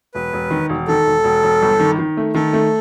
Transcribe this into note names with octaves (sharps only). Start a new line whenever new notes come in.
E1 B4
E1
D#3
E1
D#3 A4
E1
E1
E1
G1
D#3
D#3
A3
D#3 A4
A3